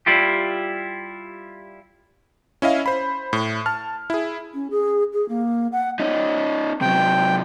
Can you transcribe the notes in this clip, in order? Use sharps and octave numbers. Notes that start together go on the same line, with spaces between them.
G3 E4 F4 G4
C#4 E4 D#5 F5
C5 B5
A2
A5 F6
E4 G#4
C#4
G#4
G#4
A#3
F#5
C#4 D#4
C3 F#3 G5